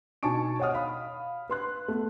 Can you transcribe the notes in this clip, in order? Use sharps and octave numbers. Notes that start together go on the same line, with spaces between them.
B2 D#4 G#5 A5 C#6 D7
C#5 D#5 F#5 D#6 F6
F5 B5 D#6
B4 C6 F#6
A3 B3